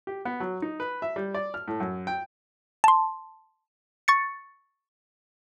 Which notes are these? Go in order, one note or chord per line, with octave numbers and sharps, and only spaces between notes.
G4
B3
F#3
D#4
B4
E5
G3
D5
F6
A2
F#2
G5
A5 C6
C#6 A6 C#7